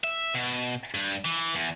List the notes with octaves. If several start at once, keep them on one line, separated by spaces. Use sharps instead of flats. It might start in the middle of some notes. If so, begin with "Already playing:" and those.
E5
B2
G2
E3
E2